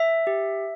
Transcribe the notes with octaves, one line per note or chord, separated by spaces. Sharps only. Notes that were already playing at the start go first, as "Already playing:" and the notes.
Already playing: E5
G4